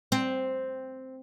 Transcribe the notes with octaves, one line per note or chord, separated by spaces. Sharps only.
C4